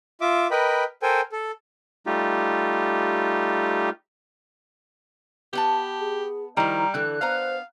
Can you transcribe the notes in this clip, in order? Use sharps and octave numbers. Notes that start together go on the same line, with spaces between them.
F4 E5 D6
A#4 B4 D#5 G5 B5
A4 A#4 C5 G5 G#5
A4
G3 A3 D#4 F4 G4
B3 G4 B4 A5
G#4
D#3 F3 G3 E4 A#5
D3 E3 A4 F#6
B3 C5 F5 A#5